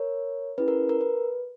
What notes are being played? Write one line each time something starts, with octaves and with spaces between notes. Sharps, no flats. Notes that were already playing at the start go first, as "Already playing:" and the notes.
Already playing: A#4 C#5
C#4 E4 G#4 B4
A#4
A#4
B4